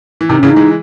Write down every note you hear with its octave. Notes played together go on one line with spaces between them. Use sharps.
E3
C3 D#3 D#4
C#3 E3 C#4
D#4
E3 G#3